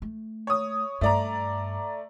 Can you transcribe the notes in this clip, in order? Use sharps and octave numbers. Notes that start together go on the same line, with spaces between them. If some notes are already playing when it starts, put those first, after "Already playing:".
A3
C#5 D#6
G2 A3 D5 A#5